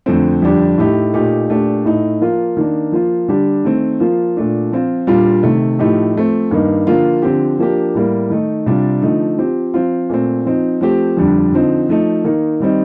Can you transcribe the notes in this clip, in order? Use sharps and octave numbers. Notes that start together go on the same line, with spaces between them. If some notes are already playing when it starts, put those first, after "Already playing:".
F2 D3 F3 A3 C4
F2 D3 G3 D4 G4
A2 A3 D#4 G4
A#2 A3 D#4 G4
A#2 A3 D4 G4
A2 A3 D#4
F3 A#3 F4
D#3 A#3 D4
F3 A#3 F4
D3 G3 D4 G4
D#3 A3 C4
F3 A#3 F4
A#2 A3 D4
F3 C4 F4
A#2 G3 D4 F4
C3 D#3 A3
A2 F3 A3 D#4 G4
F3 A3 C4
G2 D#3 A#3 D#4
D3 F3 A#3 F4
D3 F3 C4 G4
F3 A#3 D4 G4
A2 G3 A#3
D#3 A3 D#4
C3 G3 D4 F4
D3 F3 A3 D#4
F3 C4 G4
F3 C4 F4
A#2 A3 C4
F3 C4 D#4
F3 A3 C4 G4
F2 D3 G3 D4
D3 F3 C4 D#4
F3 A3 D#4
D#3 A#3 D#4
D#3 G3 C4 D#4